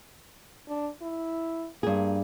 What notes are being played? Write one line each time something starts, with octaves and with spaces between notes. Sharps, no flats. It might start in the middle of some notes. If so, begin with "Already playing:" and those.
D4
E4
G2 A#3 G#4